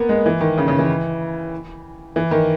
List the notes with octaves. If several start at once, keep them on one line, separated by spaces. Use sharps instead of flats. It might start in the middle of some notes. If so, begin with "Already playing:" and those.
Already playing: A#3 B3
G#3
E3
D#3
C#3
C#3
E3
E3
D#3